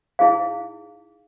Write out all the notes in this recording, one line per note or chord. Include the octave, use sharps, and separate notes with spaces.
D#4 E4 G#4 F5